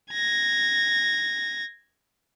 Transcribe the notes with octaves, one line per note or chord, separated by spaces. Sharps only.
G#6 A#6